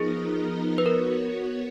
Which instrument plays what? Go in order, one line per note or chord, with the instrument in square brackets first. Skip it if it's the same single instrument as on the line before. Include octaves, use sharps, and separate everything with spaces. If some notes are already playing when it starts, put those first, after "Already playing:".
Already playing: [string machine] F3 B3 D#4 A#4 D#5 [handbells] G#4
[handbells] B4
[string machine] B3 F#4 C#5 [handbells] A#4